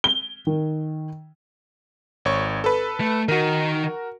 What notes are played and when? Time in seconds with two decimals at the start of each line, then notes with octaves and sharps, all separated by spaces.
0.04 G7
0.47 D#3
2.25 G#1 C#5 C#6
2.64 A4 B4
3.00 A3
3.29 D#3 D#4 F#4 A#4